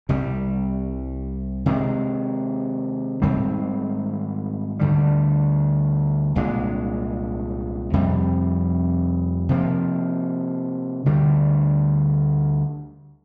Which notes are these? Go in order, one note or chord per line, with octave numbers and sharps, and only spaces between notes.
C2 C3 G3
C3 D#3 G#3
G#2 D#3 G3 C4
D2 D3 G3
C2 A#2 G#3 D4
F2 C3 G3
C3 F3 A#3
D2 D3 G3